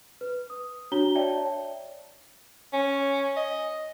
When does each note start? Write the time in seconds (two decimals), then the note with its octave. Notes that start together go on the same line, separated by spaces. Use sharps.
0.21 B4
0.50 D#6
0.92 D4 F#4 C#5 A#5 G7
1.15 C#5 D5 E5 G5 A5
2.73 C#4
3.36 D#5